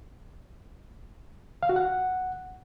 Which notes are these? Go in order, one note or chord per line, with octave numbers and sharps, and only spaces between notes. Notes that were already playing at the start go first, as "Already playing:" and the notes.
F5
F#4
F#5